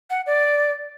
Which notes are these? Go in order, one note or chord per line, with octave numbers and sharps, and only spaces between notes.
F#5
D5